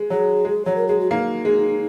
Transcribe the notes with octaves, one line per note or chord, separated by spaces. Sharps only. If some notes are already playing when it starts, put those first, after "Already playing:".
Already playing: G#3
F#3 G#4
G#3
F#3 C#5
A#4
G#3 G#4
F#4
A#3 D#4
G#3